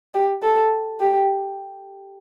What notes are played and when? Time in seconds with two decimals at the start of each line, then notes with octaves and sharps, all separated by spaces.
0.14 G4
0.43 A4
1.00 G4